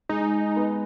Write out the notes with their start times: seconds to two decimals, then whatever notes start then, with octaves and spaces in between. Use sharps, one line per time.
0.09 G#3 D#4
0.56 B3